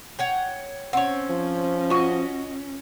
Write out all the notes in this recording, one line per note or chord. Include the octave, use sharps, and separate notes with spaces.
C#5 F#5 G5
C4 C#4 C#5 F#5
F3
F4 F#4 D#5 C#6